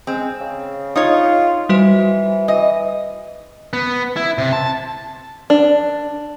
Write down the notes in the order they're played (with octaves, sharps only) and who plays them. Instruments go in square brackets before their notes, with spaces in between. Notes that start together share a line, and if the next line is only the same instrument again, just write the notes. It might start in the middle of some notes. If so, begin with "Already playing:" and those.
[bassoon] G#3 [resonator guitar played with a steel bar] C4
[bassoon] C#3
[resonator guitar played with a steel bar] D#4 C#5 [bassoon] F4
[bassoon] E3 [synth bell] G3 F#4 C5
[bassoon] E3 [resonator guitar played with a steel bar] D#5
[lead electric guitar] B3
E4
C3
A5
[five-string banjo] D4